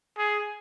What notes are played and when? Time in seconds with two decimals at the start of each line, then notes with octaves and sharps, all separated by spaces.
0.18 G#4